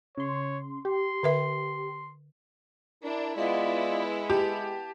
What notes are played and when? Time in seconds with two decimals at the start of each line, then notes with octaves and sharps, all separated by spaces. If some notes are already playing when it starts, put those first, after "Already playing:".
0.17 C#3 C#5 C6
0.85 G4 C6
1.23 D3 B4 E5
3.04 D4 E4 A#4
3.36 G#3 B3 E4 F4 D5 D#5
4.30 G4 A5